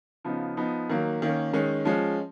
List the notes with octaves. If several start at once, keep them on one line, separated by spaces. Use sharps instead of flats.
C#3 F3 B3 D#4
F3 B3 D#4
D#3 F#3 A#3
D#3 A#3 C#4
D#3 G#3 C#4
F3 G#3 C#4